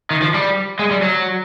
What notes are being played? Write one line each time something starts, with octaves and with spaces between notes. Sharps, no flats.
D#3
F3
G3
G#3
G3
F#3